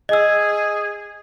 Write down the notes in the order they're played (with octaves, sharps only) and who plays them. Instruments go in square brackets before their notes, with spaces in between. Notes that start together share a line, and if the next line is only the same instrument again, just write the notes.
[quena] G#4 [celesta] D#5 E6